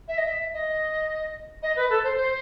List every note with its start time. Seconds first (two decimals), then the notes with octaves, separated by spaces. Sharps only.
0.08 E5
0.18 D#5
0.26 E5
0.53 D#5
1.63 D#5
1.76 B4
1.90 A4
2.04 C5
2.17 C5